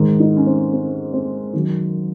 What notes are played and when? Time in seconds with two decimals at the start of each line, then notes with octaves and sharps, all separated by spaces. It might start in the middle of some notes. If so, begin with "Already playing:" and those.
Already playing: G#2 D#3
0.20 D#4
0.36 C#4
0.47 C4
0.73 C4
1.13 C4
1.53 F#2 D#3